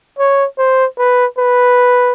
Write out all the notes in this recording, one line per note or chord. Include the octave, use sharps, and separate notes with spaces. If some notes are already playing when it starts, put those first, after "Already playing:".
C#5
C5
B4
B4